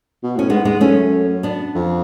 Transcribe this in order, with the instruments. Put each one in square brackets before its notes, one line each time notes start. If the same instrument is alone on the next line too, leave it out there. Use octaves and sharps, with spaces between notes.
[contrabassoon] B2
[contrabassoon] A2 [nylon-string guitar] C#4
[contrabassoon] G#2 [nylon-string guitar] G#3 B3
[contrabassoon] G#2 [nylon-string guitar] G#3 B3
[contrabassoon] F#2 [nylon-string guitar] A3 C#4
[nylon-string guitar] B3 D4
[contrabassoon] F2